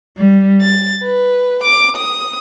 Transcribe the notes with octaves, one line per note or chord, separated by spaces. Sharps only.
G3
A6
B4
D6
D#6